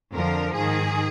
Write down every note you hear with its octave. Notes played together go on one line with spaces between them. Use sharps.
F2 D3 F3 A#4
G#2 D#3 G#4